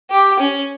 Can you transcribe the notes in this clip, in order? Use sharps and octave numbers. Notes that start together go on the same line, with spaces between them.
G4
C#4